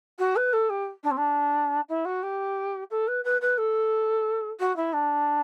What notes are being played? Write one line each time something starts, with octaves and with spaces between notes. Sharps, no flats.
F#4
B4
A4
G4
D4
C4
D4
E4
F#4
G4
A4
B4
B4
B4
A4
F#4
E4
D4